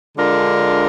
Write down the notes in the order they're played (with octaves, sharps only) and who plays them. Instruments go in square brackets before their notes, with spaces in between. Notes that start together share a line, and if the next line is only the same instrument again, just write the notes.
[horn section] D3 G#3 D4 F4 A#4